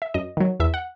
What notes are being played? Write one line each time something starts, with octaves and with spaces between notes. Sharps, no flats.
E5
F#2 D#5
D#3 F#3
E2 E5
F#5